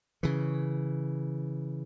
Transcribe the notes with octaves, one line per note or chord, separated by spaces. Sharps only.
C#3 E3